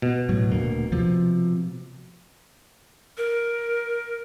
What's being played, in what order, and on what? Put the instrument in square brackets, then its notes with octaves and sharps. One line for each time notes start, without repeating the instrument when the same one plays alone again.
[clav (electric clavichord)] B2
[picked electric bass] A2 F#3
D#1 D2 A#3
C3 F3
[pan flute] A#4